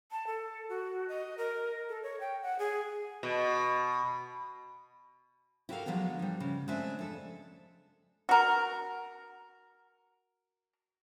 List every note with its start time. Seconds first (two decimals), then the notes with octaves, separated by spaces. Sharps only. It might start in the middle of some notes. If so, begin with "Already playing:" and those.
0.11 A5
0.27 A4
0.69 F#4
1.08 D#5
1.38 A#4
1.89 A4
2.03 C#5
2.20 G5
2.42 F#5
2.59 G#4
3.23 B2
5.69 E4 F#4 G4 A4 A#4 F5
5.86 D3 F3 F#3 G#3 B3 C#4
6.19 F3 G3
6.40 C#3
6.68 G#3 A3 C4 D4 E5 G#5
6.99 F2 A4
8.29 F#4 A#4